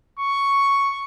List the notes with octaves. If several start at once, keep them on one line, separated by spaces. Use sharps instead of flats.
C#6